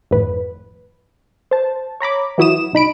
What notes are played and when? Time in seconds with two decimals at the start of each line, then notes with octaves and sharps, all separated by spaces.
0.11 G#1 F2 A2 B4
1.51 C5 A5
2.00 C#5 A#5 B5 D6
2.38 E3 F#3 E4 F#4 D#6 E7
2.73 C2 D#4 B5 D7